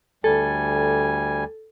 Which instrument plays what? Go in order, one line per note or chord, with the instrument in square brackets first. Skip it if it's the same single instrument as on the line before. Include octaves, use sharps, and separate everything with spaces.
[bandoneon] D2 G3 G#5 [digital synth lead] A4